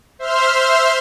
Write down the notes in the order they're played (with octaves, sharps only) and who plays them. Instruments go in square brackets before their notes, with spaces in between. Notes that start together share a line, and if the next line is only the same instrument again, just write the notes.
[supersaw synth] C5 E5 C6 F6